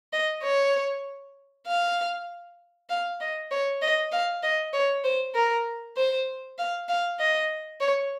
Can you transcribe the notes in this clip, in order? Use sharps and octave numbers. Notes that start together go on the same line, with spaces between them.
D#5
C#5
F5
F5
D#5
C#5
D#5
F5
D#5
C#5
C5
A#4
C5
F5
F5
D#5
C#5